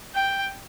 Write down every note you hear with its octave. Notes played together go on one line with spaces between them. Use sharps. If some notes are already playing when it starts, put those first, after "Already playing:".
G5